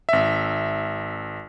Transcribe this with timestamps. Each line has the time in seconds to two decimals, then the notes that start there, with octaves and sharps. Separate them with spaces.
0.09 G#1 E5